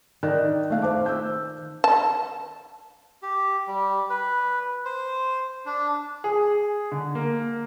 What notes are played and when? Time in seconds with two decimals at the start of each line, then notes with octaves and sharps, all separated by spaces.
0.23 D#3 D5 F#6
0.70 A3 F5 F#6
0.82 C5 A5 D6
1.06 E6 G6
1.84 A5
3.23 G4
3.68 G3
4.10 B4
4.85 C5
5.66 D4
6.24 G#4
6.92 D3
7.15 A#3